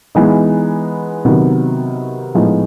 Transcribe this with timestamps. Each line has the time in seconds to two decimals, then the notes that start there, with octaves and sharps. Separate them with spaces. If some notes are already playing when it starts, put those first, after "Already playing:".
0.15 E3 G#3 B3 D#4
1.25 C3 D#3 F#3 B3
2.35 A2 F3 G#3 B3 D#4